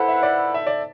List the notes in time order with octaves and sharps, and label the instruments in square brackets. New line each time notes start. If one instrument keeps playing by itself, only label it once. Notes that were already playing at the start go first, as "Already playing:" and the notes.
Already playing: [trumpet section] E4 B4 F#5 [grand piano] A4 C5
[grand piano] E5
D5
E5
D5